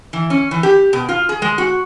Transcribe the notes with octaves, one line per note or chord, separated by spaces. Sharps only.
E3
C#4
E3
G4
B2
F4
G#4
G#3
F#4